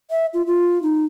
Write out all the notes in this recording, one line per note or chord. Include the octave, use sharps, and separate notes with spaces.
E5
F4
F4
D#4